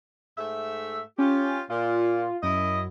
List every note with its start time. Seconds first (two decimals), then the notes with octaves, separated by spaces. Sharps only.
0.38 G#2 A3 E5
1.18 C#4 F4 G4
1.70 A#2 F4
2.43 F#2 E4 D#5